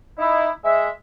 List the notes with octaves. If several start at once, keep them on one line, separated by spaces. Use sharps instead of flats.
D#4 E4
G#3 E5